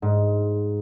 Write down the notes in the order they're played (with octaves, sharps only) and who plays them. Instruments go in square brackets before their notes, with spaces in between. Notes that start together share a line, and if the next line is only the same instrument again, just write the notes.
[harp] G#2